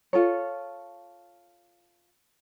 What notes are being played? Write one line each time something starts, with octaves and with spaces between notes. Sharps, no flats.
F4 A4 C#5